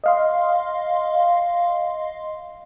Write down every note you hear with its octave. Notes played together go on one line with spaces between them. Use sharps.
D#5 F5 C6